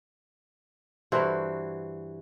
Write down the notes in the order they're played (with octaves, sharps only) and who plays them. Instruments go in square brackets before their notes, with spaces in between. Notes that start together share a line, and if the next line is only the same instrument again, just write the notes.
[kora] G2 E3 F#4 C5